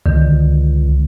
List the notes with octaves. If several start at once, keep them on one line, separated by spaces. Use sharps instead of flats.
C#2 D3 D#3